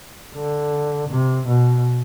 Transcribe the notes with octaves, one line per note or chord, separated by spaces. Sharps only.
D3
C3
B2